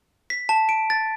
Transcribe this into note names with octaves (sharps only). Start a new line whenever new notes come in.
B6
A5
D7
A6